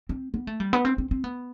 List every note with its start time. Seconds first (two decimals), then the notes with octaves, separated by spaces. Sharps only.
0.09 C4
0.34 B3
0.47 A3
0.60 G3
0.73 B3
0.85 C4
0.98 C4
1.11 C4
1.24 B3